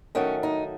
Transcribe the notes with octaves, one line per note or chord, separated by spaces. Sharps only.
D#3 F#3 A3 C#4
D#4